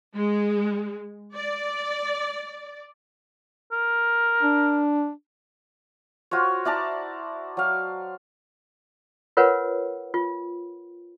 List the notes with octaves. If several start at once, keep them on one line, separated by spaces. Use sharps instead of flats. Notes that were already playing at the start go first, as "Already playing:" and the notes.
G#3
D5
A#4
D4
F4 F#4 C5 C#5
E4 D5 A5 A#5
F#3 F5
F4 A#4 B4 C#5 F#5
F4